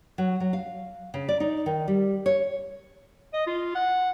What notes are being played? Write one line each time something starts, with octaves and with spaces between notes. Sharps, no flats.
F#3
F#3
F5
C#3
D5
D#4
D#3
G3
C#5
D#5
F4
F#5